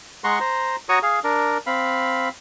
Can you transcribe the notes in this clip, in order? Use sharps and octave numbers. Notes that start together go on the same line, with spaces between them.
G#3 F#5 A#5 C6 C#6
C5 A#5
F#4 C#5 A#5 C#6 D#6
G#4 F5
D4 A#4
C4 F5 B5